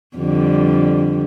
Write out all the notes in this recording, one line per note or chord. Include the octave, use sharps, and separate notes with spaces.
F2 D3 G3